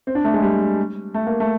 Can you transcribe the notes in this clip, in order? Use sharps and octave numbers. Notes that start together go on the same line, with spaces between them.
C4
D4
A3
G#3
G3
A3
A#3
A3